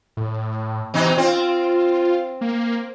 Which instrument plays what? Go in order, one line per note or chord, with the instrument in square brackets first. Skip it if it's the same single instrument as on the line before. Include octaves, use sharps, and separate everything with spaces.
[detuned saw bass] A2
[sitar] B2 D#4 [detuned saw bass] E3
[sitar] C4 [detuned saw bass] F4
[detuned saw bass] A#3